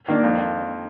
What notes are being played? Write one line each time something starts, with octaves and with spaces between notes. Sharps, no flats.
D#3 A#3 D4
F2